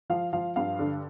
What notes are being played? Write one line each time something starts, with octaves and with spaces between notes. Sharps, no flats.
F3 F5
F3 F5
G2 F5
D3